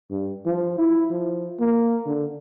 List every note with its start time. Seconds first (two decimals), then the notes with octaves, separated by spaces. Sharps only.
0.10 G2
0.45 F3
0.78 E4
1.11 F3
1.60 A#3
2.06 D3